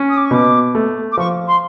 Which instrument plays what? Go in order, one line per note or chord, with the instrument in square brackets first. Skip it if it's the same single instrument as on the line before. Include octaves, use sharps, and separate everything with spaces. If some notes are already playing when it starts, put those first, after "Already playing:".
Already playing: [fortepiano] C#4
[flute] D#6
D6
C#6
[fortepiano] B2 [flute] D6
[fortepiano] A3
[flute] D6
[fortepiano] F3 [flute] C#6
[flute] C6